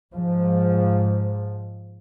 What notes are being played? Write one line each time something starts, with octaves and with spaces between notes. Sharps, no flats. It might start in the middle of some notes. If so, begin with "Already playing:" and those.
G#2 F3